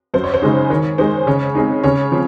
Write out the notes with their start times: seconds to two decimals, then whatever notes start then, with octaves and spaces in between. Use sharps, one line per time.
0.14 F#2 C5
0.24 C#5
0.34 C5
0.42 C#3 G#3 D#4
0.70 D#3 C#5
0.98 G#3 D#4 C5
1.27 C#3 C#5
1.55 G#3 C4 D#4
1.84 C#3 C#5
2.12 F3 C4